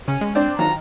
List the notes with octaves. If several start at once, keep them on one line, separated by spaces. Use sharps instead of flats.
C#3 C#4
G#3
C4 D4
D3 D#3 F#3 C4 F4 A#5